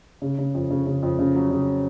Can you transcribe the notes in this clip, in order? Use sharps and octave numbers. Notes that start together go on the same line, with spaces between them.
C#3
C#3
F2
C#3
C#3
F2
C#3
F#3
C#3